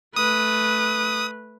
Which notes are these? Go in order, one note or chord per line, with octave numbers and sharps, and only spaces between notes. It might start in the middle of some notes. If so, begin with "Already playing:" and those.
A3 B4 D#6